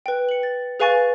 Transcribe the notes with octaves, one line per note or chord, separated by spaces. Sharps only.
B4 G5
C#7 F#7
A6
G#4 B4 F5 G#5 C#6 A6